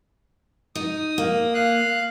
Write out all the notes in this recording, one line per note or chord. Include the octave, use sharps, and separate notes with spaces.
D#4 D#6
A#3
F5 F#6